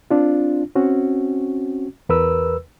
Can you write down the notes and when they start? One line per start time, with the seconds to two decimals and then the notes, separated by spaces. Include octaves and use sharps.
0.11 C4 D4 F4
0.76 C4 C#4 F#4
2.09 E2 A#4 B4 E6